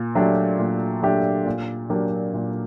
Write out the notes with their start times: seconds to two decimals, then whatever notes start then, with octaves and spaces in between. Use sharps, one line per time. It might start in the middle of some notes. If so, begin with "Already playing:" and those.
Already playing: A#2
0.15 F#3 A3 D4 G4
0.59 A#2
1.03 F#3 A3 D4 G4
1.46 A#2
1.90 F#3 A#3 D4 G4
2.34 A#2